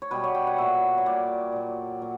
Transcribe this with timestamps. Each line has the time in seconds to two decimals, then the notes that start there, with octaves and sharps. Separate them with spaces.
0.02 C#5
0.11 B2 G3 B4
0.24 C#5
0.35 G5
0.47 F#5
0.58 A#2 F#3 E5
0.98 C#5
1.06 A#2 G3 D5
1.52 A#2 F#3
2.01 A#2 F#3